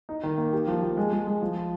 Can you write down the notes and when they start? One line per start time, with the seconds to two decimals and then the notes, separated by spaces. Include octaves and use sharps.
0.09 D#4
0.23 D#3
0.38 A#3
0.53 G4
0.67 F3
0.82 F3
0.97 G#3
1.12 G#3
1.27 G#3
1.42 F3